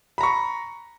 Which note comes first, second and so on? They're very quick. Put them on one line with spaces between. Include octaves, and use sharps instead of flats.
B5 A#5 C#6